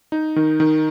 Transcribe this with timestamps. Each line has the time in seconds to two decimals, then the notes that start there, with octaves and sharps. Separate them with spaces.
0.12 D#4
0.36 D#3
0.60 D#3